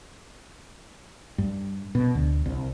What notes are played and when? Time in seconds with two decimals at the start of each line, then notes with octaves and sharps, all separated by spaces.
1.38 G2
1.95 B2
2.15 D2
2.46 C2